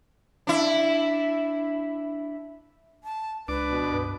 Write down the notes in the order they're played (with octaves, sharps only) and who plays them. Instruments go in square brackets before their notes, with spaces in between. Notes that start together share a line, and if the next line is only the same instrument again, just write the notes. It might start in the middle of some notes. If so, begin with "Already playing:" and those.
[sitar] D4 E4
[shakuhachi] A5
[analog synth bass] C#2 [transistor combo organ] D4 D6 [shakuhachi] B4
[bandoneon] B2
[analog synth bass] G2